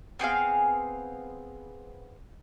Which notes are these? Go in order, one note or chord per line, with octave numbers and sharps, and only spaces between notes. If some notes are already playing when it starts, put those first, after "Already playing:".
B3 C4 G#4 F5